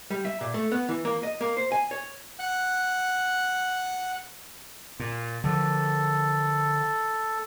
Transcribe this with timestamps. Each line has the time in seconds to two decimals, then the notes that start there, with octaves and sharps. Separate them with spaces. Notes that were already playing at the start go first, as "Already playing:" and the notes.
0.10 G3
0.25 E5
0.41 A#2
0.54 A3
0.72 B3
0.89 E3
1.05 A#3
1.23 D#5
1.41 A#3
1.57 C5
1.72 G#5
1.91 C#5
2.39 F#5 F#6
5.00 A#2
5.44 D3 F3 A4